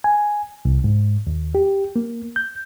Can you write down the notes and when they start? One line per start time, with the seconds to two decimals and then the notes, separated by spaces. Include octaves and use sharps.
0.04 G#5
0.65 C2
0.84 G#2
1.27 D#2
1.55 G4
1.96 A#3
2.36 G6